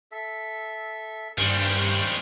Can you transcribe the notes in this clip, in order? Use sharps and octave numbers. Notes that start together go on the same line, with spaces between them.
A4 E5
G2 D#3 G3 C#4 C5 F5